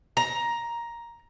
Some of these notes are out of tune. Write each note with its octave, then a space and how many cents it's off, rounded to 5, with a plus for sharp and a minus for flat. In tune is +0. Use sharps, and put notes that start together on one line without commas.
A#5 +10